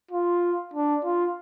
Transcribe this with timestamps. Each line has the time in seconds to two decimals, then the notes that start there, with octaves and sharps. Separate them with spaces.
0.11 F4
0.74 D4
1.04 F4